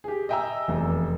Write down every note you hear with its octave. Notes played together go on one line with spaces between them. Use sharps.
G4 G#4
D#5 E5 G5 G#5 A#5 E6
F1 E2